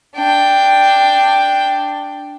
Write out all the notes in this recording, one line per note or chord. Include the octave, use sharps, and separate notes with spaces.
D4 G5